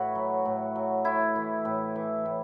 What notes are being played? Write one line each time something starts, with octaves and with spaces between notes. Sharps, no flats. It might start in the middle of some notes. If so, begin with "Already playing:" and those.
Already playing: A2 F#4 B4 C#5
F#3
A2
F#3
A2 E4
E3
A2
E3
A2